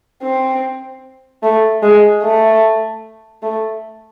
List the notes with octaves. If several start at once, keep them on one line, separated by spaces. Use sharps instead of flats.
C4
A3
G#3
A3
A3